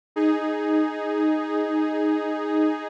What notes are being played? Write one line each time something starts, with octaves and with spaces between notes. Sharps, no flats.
D#4 G#4